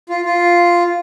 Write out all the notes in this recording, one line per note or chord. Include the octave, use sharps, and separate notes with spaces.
F4
F4